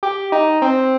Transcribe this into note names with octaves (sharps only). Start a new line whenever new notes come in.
G4
D#4
C4